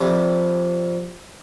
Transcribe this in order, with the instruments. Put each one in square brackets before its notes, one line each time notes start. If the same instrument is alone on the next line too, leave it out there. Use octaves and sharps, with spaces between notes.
[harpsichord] F2 C3 G3